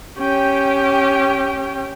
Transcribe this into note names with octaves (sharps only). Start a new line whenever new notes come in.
C#4 G4 G5